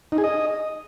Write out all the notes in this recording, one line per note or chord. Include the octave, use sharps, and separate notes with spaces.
D#4
G#4
D#5